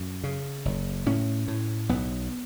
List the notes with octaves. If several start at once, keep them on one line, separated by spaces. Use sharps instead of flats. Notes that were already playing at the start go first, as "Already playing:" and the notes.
Already playing: F#2
C#3
F#1
A2 C#4
A2
B1 B3